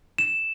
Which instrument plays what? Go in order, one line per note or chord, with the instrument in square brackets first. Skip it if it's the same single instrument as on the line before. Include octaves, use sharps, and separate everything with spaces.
[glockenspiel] E7